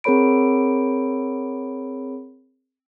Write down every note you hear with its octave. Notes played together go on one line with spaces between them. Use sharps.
C4 G#4 A#4 C#5 B5 D7